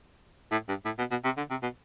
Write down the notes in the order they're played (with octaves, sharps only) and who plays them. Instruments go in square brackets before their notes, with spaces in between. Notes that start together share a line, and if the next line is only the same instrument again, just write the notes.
[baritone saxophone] A2
G2
A2
B2
B2
C3
D3
C3
B2